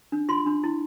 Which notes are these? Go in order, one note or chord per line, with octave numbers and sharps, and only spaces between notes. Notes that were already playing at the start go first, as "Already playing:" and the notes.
D4
F4 C6
D4
E4